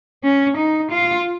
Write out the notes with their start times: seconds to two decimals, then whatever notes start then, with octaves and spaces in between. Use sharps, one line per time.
0.24 C#4
0.57 D#4
0.91 F4